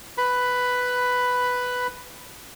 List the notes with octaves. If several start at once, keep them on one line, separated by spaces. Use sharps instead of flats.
B4 B5